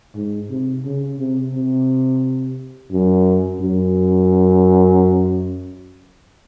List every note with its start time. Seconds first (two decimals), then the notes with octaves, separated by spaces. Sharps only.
0.15 G#2
0.50 C3
0.84 C#3
1.19 C3
1.54 C3
2.92 F#2
3.61 F#2